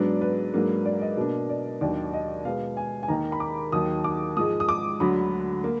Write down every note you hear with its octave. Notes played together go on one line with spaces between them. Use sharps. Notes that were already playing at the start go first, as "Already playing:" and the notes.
Already playing: G#2 F#3 B3 D4 D5
B4
G#2 F#3 A#3 D4
D5
D#5
B2 A#3 D4
D5
D#2 D#3 F#3 D4 D5
D#5
B2 G#3 B3 F5
G#5
G#5
D#2 D#3 A#3 A#5
B5
D6
D#2 D#3 F#3 D#6
D6
G#2 F3 G#3 D#6
D#6
D6
D2 D3 F#3 B5
A#3